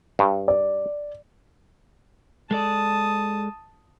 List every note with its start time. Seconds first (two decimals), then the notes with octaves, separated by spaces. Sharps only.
0.19 G2
0.48 D5
2.51 G#3 A4 D5 A5 D#6